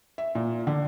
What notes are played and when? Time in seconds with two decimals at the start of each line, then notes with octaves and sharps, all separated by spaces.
0.18 E5
0.35 A#2
0.67 D3